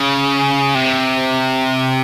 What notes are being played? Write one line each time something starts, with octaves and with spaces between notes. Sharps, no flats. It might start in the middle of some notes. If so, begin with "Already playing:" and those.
Already playing: C#3
C3